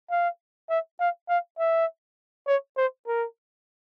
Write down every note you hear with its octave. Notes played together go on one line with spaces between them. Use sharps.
F5
E5
F5
F5
E5
C#5
C5
A#4